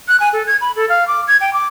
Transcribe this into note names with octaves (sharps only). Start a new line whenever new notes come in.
F#6
G#5
A4
G#6
B5
A4
F5
D6
G#6
G5
D6